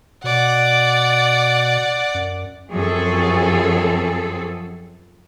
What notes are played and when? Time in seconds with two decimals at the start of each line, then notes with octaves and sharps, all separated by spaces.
0.24 B2 D5 F#5
2.14 F#2
2.70 F#2 F3 C4 G#4 A4